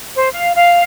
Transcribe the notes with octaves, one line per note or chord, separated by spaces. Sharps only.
C5
F5
F5